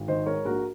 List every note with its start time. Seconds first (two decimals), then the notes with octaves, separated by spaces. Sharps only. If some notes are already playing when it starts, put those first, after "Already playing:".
Already playing: G#1
0.08 D#3 C5 D#5
0.26 G#2 A#4 C#5
0.45 A#1 F#4 A#4